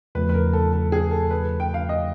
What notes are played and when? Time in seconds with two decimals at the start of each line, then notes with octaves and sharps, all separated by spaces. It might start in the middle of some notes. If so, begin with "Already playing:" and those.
0.15 E2 C#3 F3 A3 B4
0.29 B4
0.34 A#4
0.53 A4
0.73 A4
0.92 G#4
1.11 A4
1.31 B4
1.60 G5
1.74 F5
1.89 D#5